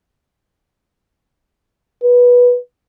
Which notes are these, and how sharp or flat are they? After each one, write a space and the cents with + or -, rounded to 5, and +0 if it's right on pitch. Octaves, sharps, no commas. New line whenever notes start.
B4 -15